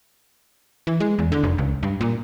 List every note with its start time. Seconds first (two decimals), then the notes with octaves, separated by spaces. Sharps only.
0.87 E3
1.00 G#3
1.19 E2
1.32 D3
1.43 F1
1.58 C#2
1.83 G2
2.01 A#2